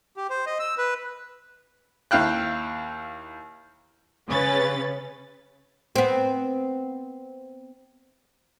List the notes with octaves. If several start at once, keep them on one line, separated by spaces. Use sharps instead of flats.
G4
C5
D#5
E6
B4
D#2 E4 F5 G5 F#6
C#3 C#4 B4 A6
B3 C4